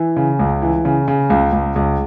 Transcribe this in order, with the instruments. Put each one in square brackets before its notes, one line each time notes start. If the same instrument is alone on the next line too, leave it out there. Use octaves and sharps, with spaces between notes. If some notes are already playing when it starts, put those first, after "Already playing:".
Already playing: [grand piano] E3
C#3
C#2
E3
C#3
C#3
C#2
C#2
C#2